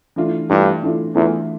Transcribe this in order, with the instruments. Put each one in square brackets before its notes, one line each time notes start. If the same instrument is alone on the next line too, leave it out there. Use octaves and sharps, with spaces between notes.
[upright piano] E3 A3 D4 F4
[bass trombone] G2 [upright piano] E3 A3 D4 F4
[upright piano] E3 A3 D4 F4
[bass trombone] E2 [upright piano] E3 A3 D4 F4